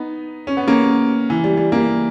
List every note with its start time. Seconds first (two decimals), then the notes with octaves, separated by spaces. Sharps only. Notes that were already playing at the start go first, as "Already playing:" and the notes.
Already playing: B3 D#4
0.47 C#4
0.57 B3
0.68 A#3 C#4
1.30 E3
1.44 G3
1.57 G3
1.72 G3 A#3